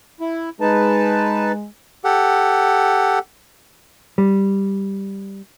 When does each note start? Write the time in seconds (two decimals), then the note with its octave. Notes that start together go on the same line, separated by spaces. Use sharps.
0.20 E4
0.61 G#3 D#4 B4 A5
2.04 G4 A4 F#5
4.18 G3